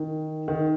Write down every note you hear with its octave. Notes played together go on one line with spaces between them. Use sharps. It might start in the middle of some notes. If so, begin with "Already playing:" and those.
Already playing: D#3
D#3